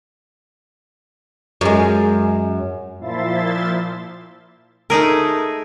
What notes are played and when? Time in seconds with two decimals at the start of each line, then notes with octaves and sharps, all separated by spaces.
1.61 F#2 G#3
3.00 A#2 F3 E4 E5 C6 A6
4.90 A3 D#4 G#4 A#4